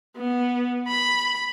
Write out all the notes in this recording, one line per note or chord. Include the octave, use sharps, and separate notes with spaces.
B3
B5